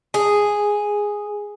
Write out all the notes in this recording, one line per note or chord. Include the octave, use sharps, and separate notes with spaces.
G#4